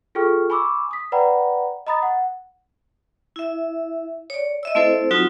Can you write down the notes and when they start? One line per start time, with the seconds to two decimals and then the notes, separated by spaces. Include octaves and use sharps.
0.15 F4 G#4 A4 G5 C#6 F6
0.50 G#5 B5 C#6 D6 E6
0.91 D#6 B6
1.12 B4 D5 F#5 G5 A#5 B5
1.87 D#5 A#5 B5 D#6 A6
2.02 F#5
3.36 E4 E5
4.30 C#5 D5
4.63 D#5 E5 E6
4.75 A3 C4 E4 A4 C5
5.11 F#3 C4 D#4 F4 F#4